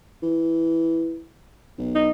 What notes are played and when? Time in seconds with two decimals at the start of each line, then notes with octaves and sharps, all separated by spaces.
0.22 E3
1.78 B1
1.95 D#4